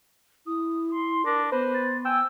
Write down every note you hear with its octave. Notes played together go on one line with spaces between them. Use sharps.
E4 D#6
C6
D4 A#4 A#6
B3 B4 C5
A6
G5 G#5 E6